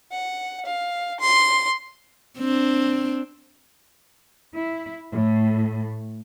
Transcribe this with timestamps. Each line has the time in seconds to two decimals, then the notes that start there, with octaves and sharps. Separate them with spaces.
0.12 F#5
0.66 F5
1.20 C6
2.39 C4 D4
4.56 E4
5.12 A2